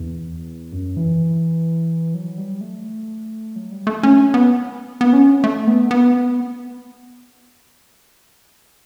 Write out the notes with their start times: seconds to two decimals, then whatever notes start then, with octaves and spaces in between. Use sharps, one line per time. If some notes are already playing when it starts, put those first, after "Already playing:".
Already playing: E2
0.72 F#2
0.97 E3
2.14 F#3
2.37 G3
2.61 A3
3.56 F#3
3.71 G3
3.87 A3
4.03 C#4
4.34 B3
5.01 B3
5.13 C#4
5.44 A3
5.67 B3
5.91 B3